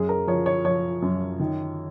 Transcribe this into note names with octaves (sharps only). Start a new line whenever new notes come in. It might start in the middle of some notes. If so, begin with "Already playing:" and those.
Already playing: F#2 G#4
A#4
F3 C#5
C#5
F3 C#5
F#2
D#3